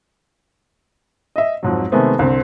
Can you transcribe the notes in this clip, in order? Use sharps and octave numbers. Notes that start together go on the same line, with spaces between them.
D#5 E5
F2 G#2 F#3
C3 D#3 G#3 A3 B3 C4
C2 D3 C4